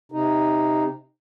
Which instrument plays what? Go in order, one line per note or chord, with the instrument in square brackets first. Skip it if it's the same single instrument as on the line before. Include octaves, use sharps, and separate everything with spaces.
[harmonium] C3 D#4